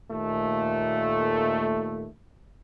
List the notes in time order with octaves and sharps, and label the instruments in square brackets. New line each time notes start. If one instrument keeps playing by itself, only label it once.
[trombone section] D#2 A#2 A3